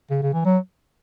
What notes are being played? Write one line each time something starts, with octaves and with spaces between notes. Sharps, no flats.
C#3
C#3
E3
F#3